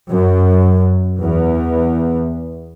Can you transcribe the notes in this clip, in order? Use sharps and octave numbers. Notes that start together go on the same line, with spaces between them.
F#2
E2